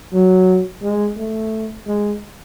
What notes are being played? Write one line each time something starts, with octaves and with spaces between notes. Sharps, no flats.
F#3
G#3
A3
G#3